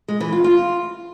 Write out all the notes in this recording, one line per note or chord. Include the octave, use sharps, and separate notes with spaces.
G#3
E3
F4
F4